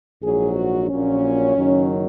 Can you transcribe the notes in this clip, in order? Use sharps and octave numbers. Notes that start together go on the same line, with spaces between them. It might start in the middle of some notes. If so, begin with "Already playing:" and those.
A#1 G#2 F#3 G#4
F#4
A#1 A#2 F#3 C#4
F#1 F#2 D#3 F#3